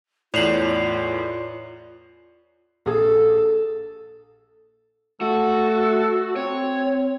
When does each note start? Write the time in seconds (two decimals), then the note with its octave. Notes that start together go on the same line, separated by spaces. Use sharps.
0.34 E2 A2 F4 C#5 D5 C7 F7 F#7
2.86 A#1 G#4 A4
5.21 A3 F#4 A4
6.36 C4 C#5